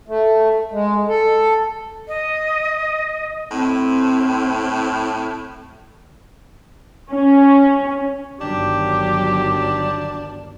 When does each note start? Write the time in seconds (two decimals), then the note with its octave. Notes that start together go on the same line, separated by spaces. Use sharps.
0.08 A3
0.72 G#3
1.09 A4
2.08 D#5
3.51 A2 C4
7.10 C#4
8.41 G1 D#3 F#3 D4 G4